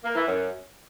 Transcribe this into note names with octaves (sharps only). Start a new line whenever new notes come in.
A#3
E3
F#2